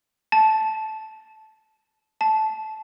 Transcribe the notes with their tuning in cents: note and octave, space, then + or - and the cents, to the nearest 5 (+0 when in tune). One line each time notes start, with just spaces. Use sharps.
A5 -10
A5 -15